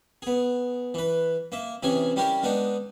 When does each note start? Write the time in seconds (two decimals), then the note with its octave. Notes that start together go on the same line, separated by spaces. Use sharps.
0.22 B3 G#4
0.94 E3 B4
1.52 A#3 E5
1.83 C3 E3 C#4 G#4 G#5
2.16 G3 C#4 E4 G4 A#4
2.43 G#3 B3 D4 D#4